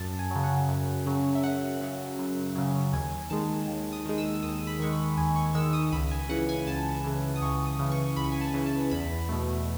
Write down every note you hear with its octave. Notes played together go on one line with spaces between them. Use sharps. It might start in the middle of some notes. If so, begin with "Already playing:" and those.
Already playing: F#2 A5
G#5
C#3 F#3
F#5
F#2
C#3 F#3
E5
F#2 F#5
C#3 F#3
F#2
C#3 F#3
D#2 G#5
D#3 G#3 A5
D#2
D#6
D#3 G#3
E6
D#2 D#6
B5
D#3 G#3 C#6
B5
D#2 G#5
C#6
D#3 G#3 E6
D#6
C#2 B5
G#5
C#3 E3 F#5
G#5
C#2 A5
C#3 E3
D#6
C#2 C#6
D#6
C#3 E3
C#6
C#2 B5
G#5
A5
C#3 E3
A5
E2 B5
B2 A3